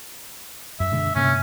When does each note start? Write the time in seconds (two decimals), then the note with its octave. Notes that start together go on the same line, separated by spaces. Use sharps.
0.80 F#2 E5
0.92 B2 D3 G#3
1.16 G2 C3 A#3 C#4